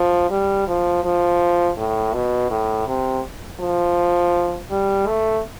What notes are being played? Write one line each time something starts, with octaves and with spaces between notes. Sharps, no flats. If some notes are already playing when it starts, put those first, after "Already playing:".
Already playing: F3
G3
F3
F3
A2
B2
A2
C3
F3
G3
A3